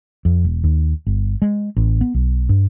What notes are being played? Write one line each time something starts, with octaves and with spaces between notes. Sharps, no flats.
F2
E1
D#2
G1
G#3
A1
B3
B1
G2